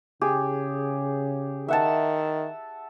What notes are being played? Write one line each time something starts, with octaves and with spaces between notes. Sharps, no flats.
C#3 G4 G#4
D#3 E5 F#5 A5